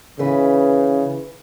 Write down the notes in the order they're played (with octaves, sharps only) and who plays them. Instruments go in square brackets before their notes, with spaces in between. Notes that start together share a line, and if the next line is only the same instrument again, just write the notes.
[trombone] C#3 [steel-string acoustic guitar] E3 B4